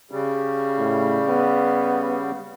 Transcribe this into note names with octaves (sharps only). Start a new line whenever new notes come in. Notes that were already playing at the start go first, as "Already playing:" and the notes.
C#3 G3
A2
B3